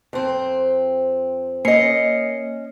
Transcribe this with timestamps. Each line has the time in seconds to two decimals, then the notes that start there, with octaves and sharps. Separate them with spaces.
0.13 F2 C4
1.65 A#3 C#4 D#5 C7 C#7